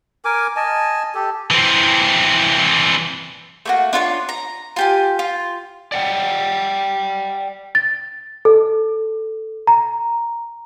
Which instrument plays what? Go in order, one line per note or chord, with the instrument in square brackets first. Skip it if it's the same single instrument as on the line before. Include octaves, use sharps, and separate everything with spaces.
[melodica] A#4 G#5 D6
D#5 G#5 A5
G4 A4
[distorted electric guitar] E3 C4
[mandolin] A3 A#3 F#4
D4 F4 A#4 C#5
A#5
F4 G4 G#5
F4
[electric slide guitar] D5 F#5 G5
[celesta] A6
A4
A#5